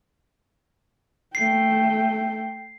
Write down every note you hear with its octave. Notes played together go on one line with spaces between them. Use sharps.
A3 G5 C7